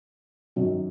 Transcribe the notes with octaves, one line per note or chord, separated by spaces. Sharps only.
F#2 D#3 F#3